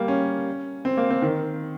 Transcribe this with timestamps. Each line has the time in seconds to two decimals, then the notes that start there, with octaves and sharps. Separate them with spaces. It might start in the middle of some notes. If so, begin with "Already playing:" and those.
Already playing: G3 A#3
0.08 C#4
0.85 C4
0.97 A#3
1.10 C4
1.22 D#3